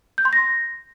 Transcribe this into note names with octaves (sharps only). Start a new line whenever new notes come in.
G6
C6
A#6